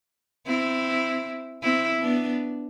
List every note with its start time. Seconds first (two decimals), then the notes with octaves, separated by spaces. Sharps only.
0.46 C4 E4
1.62 C4 E4
2.01 B3 D4